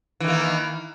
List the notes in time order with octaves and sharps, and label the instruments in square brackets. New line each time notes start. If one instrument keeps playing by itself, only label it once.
[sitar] E3
D#3
A#3